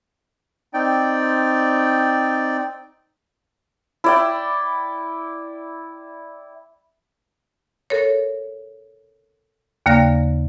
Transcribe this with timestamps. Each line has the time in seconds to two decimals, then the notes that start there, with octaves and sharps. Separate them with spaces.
0.74 C4 D#4 D5 G5
4.04 E4 D5 G5
7.90 A4 A#4 C#5
9.86 D#2 C#3 A#3 D5 F5 A#6